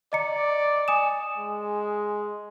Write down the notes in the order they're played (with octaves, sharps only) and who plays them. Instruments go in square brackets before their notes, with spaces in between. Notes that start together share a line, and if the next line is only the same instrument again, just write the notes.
[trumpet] D5 [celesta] D#5 A#5 C#7
[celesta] G#5 D#6 E7
[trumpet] G#3